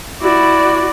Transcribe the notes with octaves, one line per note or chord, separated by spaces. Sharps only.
E4 F#4 D5